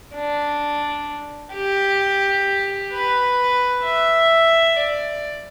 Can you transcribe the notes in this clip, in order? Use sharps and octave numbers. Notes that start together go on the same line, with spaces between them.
D4
G4
B4
E5
D5